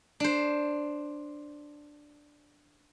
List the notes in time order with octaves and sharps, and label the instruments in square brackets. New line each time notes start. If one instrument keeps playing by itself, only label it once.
[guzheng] D4 C5